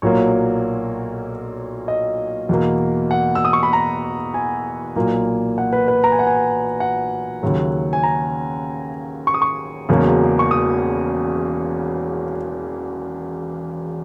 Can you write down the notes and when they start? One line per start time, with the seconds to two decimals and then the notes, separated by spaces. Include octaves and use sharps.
0.02 B1 A#2 F#3 A#3 C#5
1.88 D#5
2.49 E2 B2 A#3
3.11 F#5
3.35 E6
3.45 D#6
3.53 C#6
3.63 B5
3.73 A#5
4.34 G#5
4.96 B1 A#2 A#3
5.58 F#5
5.73 B4
5.88 B4
6.04 A#5
6.12 G#5
6.19 F#5
6.27 G#5
6.80 F#5
7.43 D#2 C#3 F#3
7.93 G#5
8.03 A#5
9.27 C#6
9.34 D#6
9.42 C#6
9.89 E1 E2 C#3 F#3 A#3
10.39 C#6
10.51 D#6